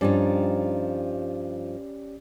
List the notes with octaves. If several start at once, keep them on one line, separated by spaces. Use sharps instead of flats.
G2 F3 C#4 D#4 G4 D5